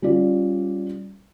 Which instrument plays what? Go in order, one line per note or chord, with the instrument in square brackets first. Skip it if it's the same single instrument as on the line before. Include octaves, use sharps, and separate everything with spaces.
[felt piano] G3 C#4 F4 D5